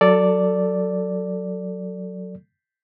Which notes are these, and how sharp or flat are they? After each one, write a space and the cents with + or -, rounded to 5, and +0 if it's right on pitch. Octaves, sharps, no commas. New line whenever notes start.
F#3 -5 A4 +15 D5 -5